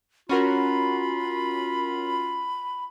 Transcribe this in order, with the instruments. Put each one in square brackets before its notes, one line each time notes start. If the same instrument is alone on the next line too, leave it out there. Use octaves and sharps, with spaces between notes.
[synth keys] C#4 F#4 A#4 [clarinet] F4 [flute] B5